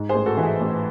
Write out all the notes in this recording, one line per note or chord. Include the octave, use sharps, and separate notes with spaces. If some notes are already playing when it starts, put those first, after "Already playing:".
Already playing: G#2
G#4 C5
A1
F#4 A4
E3
E4 G#4
A1